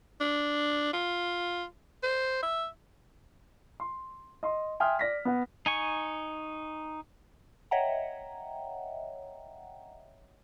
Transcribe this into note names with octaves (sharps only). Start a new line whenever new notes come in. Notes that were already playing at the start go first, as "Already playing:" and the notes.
D4
F4
C5
E5
C6
D#5 C6
E5 G5 G#5 C6 D#6 F6
D5 A#6 B6
B3 F#5
D#4 G#5 C#6
C#5 D#5 E5 F#5 G5 A#5